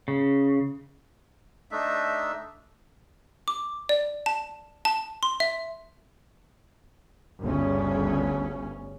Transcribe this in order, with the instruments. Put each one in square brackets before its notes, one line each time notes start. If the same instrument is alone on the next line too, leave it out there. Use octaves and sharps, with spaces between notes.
[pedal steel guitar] C#3
[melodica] A3 D4 D#4 E5
[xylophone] D6
D5
A5
A5
C6
E5
[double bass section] G1 D2 C#3 C#4